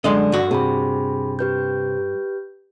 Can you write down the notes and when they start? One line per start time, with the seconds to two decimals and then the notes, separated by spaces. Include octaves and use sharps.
0.04 F#2 D3 G#3 D#5
0.32 G2 F#4
0.51 C3 G#4 B5
1.39 G4 B4 G6